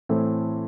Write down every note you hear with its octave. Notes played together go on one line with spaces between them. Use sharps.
A2 E3 A3 C4